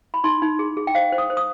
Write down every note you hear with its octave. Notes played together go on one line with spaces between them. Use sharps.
B5
D#4 C6
D#4
G#4
G#4
G5
C5 F5
C5
D#6
C5
D#6